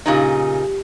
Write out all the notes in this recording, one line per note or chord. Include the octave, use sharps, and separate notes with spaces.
A#2 C#3 D#4 G4